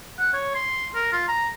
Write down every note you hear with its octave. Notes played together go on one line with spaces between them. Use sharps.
F#5
C#5
C6
A#4
F4
A#5